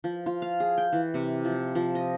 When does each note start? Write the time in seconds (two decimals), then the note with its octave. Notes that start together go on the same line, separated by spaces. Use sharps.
0.04 F3
0.26 F4
0.42 F5
0.60 G#4
0.78 G5
0.93 E3
1.14 C3
1.45 F3
1.75 F3
1.95 D#5